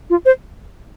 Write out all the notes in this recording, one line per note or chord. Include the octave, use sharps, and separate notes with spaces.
F4
C5